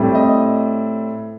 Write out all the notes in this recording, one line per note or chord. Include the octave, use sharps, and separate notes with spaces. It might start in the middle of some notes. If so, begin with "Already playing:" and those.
Already playing: A2 G3 C4
D#5